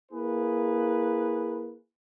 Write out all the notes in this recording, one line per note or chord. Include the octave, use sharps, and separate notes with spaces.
A#3 E4 G#4 B4